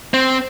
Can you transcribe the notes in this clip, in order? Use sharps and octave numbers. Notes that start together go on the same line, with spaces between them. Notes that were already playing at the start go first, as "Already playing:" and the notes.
C4